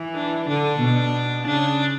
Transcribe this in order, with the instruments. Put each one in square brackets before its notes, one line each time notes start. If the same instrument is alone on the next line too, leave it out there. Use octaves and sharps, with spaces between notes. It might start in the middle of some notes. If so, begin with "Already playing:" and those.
Already playing: [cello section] E3
[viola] D4
[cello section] D3 [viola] D4
[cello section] B2
[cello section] C#3 [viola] D4